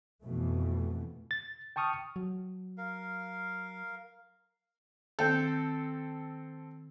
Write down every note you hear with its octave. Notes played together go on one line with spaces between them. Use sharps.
F2 B2 E3 A3
A6
G5 A5 C#6 D#6 F6
F#3
A#4 F5
D#3 C4 A4 G6